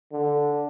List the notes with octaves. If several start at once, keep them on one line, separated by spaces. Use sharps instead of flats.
D3